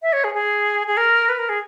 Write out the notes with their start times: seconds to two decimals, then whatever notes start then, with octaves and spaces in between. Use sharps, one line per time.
0.02 E5
0.13 C#5
0.24 G#4
0.34 G#4
0.87 G#4
0.97 A#4
1.29 B4
1.39 A#4
1.49 G#4